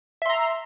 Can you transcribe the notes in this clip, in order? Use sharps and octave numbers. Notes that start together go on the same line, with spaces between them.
E5 A#5 C6